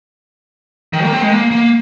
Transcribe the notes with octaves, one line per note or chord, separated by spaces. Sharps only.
D#3
A#3
C4
G#3
A#3
A#3